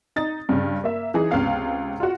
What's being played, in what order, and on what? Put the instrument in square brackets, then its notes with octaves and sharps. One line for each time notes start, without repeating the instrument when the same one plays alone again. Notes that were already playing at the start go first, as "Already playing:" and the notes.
[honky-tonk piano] D#4 A6
G2 C#3
A#3 E5
E3 D#4 G#4
C#2 C3 B3 F5 F6
F4 F#4